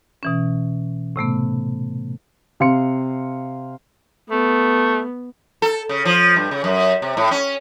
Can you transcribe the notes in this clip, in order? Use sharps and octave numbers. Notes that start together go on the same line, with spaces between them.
B2 E3 C#4
A2 C3 A3 B3
C3 F5 C6 C#7
A3 B3
A4
C#3
F3
G2
C#3
F#2
C3
A2
C#4